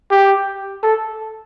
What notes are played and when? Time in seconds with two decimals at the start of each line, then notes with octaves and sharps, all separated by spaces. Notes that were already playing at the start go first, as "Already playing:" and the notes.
0.11 G4
0.83 A4